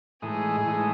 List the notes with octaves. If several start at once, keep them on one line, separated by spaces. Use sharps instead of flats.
A2 E3 G#3 D#4 G#4
A2 E3 G#3 D#4